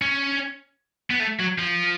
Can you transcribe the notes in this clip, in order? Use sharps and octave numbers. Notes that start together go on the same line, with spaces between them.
C#4
B3
A3
F#3
F3